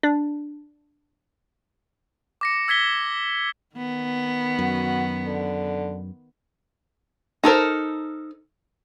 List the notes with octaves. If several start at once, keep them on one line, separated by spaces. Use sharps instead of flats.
D4
D6 A#6 C#7
E6 G#6 B6 G7
D#3 B3
F#2 F#4
D3
D#4 A4 A#4 C5